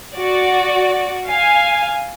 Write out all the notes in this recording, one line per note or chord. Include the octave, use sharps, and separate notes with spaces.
F#4 D5
F5 G#5